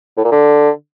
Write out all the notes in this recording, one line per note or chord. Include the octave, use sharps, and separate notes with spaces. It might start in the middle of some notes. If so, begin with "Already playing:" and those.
A2
A#2
D3